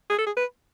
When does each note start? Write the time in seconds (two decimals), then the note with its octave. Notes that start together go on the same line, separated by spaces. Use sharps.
0.10 G#4
0.18 A4
0.26 G#4
0.37 B4